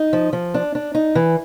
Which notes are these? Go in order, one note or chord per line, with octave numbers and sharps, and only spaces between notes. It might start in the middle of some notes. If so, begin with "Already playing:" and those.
Already playing: D#4
F3
F3
D4
D4
D#4
E3